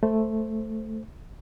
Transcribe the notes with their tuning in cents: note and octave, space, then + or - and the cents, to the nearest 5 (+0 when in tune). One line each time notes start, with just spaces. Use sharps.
A3 +0 C5 +0